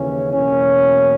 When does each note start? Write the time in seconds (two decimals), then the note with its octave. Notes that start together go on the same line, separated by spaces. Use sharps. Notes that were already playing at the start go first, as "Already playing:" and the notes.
Already playing: D#2 C#3 E3 C#4
0.34 E2 B2 F#3 A#3 C#4